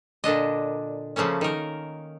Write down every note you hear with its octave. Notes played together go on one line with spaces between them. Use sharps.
A#2 D3 D4 D#5
C#3 F3 A3 A#3 C#4
D#3 D#4 A#4